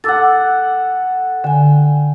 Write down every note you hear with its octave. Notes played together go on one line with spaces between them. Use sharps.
A4 F#5 D6 E6 A6
D3 G5 G#5